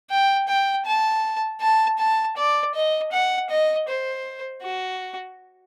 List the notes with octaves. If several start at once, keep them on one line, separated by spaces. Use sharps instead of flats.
G5
G5
A5
A5
A5
D5
D#5
F#5
D#5
C5
F#4